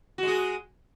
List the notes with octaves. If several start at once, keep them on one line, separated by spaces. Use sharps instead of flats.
G#3 F#4 G#4